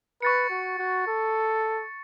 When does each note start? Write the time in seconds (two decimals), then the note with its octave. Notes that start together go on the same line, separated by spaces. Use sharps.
0.22 B4 C#6 A6 C#7
0.50 F#4
0.79 F#4
1.07 A4